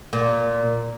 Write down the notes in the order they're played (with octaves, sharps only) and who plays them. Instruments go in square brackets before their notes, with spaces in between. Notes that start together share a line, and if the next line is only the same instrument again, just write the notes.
[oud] A#2